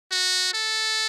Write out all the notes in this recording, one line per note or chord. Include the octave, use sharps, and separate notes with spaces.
F#4
A4